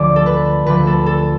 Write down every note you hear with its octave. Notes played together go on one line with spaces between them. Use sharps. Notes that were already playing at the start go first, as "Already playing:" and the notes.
Already playing: D2 D3 F3 A3 D5
A4
B4
D2 D3 F3 A3 B4
A4
A4